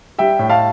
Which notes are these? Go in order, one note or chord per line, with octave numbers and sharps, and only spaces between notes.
G3 E5 G5
A2
F5 A5